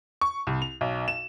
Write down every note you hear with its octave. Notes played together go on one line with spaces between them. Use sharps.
C#6
C2
F7
B1
E7